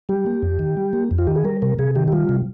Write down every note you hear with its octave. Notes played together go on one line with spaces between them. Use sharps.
G3 G4
A#3
F2
D#3
G3
A#3
F2
F4
D#3 G4
G#4
G3 A#4
C3 A#4
C3 G#4
D#3 G4
G4
G3 F4
C3